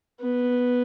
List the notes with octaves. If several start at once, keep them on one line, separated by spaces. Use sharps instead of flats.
B3